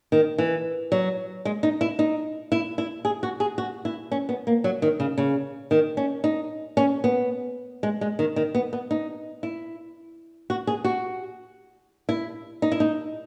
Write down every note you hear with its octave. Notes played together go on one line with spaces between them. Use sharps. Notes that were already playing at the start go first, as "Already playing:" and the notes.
D#3
E3
F#3
G#3
D#4
E4
D#4
E4
E4
G#4
F#4
G#4
F#4
E4
C#4
B3
A#3
F#3
D#3
C#3
C#3
D#3
C#4
D#4
C#4
B3
G#3
G#3
D#3
D#3
B3
B3
D#4
E4
F#4
G#4
F#4
E4
D#4
E4
D#4